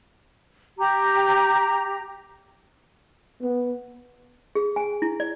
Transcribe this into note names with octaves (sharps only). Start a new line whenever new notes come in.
G4 A#5
B3
G#4
G#5
E4
D5